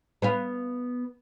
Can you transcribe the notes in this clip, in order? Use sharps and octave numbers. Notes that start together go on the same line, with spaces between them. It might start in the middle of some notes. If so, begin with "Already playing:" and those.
B3 B4 F5